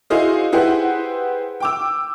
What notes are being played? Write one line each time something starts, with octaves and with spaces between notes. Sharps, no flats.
E4 F#4 G#4 C5 D#5 F5
E4 G4 G#4 B4 C5 F#5
G5 D6 E6